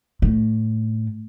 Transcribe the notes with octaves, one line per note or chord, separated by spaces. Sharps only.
A2